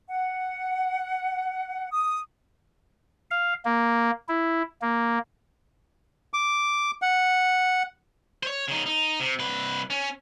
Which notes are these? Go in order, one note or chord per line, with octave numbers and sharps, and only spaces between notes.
F#5
D#6
F5
A#3
E4
A#3
D6
F#5
C5 C#5
C#3 D#4
D#4
C3
C2 B4
C#4